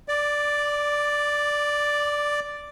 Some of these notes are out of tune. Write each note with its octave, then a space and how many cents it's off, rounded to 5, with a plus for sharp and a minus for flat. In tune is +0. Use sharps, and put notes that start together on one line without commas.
D5 +0 D6 +20